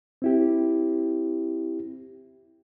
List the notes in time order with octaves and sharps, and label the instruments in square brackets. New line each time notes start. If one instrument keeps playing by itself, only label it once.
[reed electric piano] C4 E4 G4